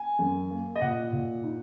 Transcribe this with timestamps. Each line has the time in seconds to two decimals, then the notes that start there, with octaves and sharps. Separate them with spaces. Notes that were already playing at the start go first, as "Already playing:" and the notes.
Already playing: G#5
0.19 F#2
0.50 A#3
0.76 D#5
0.81 A#2 F#5
1.13 A#2
1.44 D#4